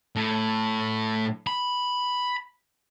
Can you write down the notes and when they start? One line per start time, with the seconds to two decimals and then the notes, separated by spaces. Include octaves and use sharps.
0.16 A2
1.47 B5